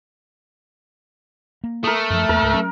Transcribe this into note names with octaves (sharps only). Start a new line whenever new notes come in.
A#3
A3 A#4 D#6
F#2 F3
E2 A#3 A#4
C#2 G#2
F#3 C#4